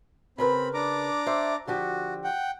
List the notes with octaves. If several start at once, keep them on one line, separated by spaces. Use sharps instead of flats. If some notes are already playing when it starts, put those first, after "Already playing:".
C#3 C4 A#4 B4 B5
D4 A#5 D6
C5 E5
D3 F3 F#4 G4
F#5 G5